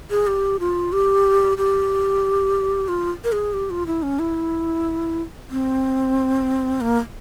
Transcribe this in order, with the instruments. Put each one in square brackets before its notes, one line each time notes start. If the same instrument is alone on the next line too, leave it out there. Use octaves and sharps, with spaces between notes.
[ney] G#4
G4
F4
G4
G4
F4
A#4
G#4
G4
F4
E4
C#4
E4
C4
A#3